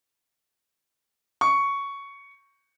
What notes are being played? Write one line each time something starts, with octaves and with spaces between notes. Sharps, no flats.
C#6